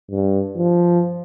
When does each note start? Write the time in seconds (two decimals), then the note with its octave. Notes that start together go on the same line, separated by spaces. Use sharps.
0.11 G2
0.57 F3